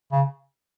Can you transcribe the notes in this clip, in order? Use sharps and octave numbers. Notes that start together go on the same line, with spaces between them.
C#3